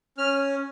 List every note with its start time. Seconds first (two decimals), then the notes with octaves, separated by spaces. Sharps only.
0.17 C#4 F6